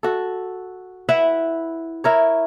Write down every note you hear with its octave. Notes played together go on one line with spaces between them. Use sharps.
F#4 A4
E4 B4 E5 F#5
E4 A#4 C#5